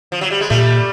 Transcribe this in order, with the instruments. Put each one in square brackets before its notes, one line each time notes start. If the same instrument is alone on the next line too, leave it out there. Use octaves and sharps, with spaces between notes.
[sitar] F3
F#3
G3
G#3
[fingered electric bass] A#2 [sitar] G3 A3